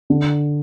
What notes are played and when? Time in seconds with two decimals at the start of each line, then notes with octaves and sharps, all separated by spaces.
0.10 D3